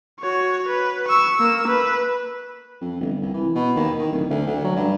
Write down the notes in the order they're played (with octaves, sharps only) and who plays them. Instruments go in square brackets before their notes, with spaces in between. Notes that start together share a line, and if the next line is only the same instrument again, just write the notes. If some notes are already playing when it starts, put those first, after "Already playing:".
[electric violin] F#4 C#5
B4
C#6 E6
A#3 E6
B4
[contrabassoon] F2
G1
C2
E3
B2
D#2
D#3
D1
D2
D2
F#3
G2